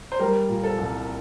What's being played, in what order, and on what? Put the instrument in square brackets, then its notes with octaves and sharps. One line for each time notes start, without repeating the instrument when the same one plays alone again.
[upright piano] C5
[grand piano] G3 [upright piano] A#4
[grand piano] A#2
[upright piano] A4
[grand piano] C2